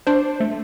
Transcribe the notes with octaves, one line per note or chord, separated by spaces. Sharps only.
D4 C5
A3